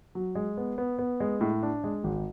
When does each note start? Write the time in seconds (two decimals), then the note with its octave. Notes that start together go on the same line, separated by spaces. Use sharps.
0.15 F#3
0.35 G#3
0.57 B3
0.78 B3
0.99 B3
1.20 G#3
1.41 A2
1.63 D4
1.84 G#3
2.04 G#1